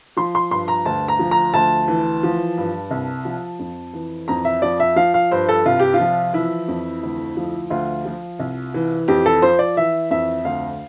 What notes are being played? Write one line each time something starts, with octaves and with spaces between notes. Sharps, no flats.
F3 C6
C6
G2 C6
A#5
D2 A5
A#5
F3
A#5
D2 A5
E3
F3
G2
C2
F3
F2
E3
F2 A#5
E5
F3 D5
E5
F3 F5
F5
G2 C5
A4
C2 F4
G4
F4
F3
E3 E4
F2
D2
F3
D2 F4
F3
C2
E3
F2 G4
A4
F3 C5
D5
E3 E5
F2 E5
D2 F5